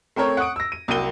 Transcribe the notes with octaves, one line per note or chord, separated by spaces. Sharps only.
A3 C4 A#4 C#5
F#5 C#6 D#6 D7
E6 A#6
D#7
C2 F#3 A#3 G5 D#7 G7